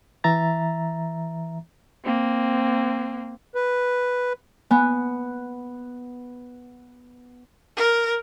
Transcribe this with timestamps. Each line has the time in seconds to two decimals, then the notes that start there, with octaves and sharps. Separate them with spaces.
0.24 E3 E5 A#5 A6
2.04 A#3 C4
3.55 B4
4.71 B3 G#5 B5 F#6
7.77 A#4